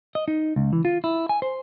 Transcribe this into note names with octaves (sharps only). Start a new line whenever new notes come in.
D#5
D#4
C#2
E3
F4
E4
G#5
C5